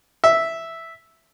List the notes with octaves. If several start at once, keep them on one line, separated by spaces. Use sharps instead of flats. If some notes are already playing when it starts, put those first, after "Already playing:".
E5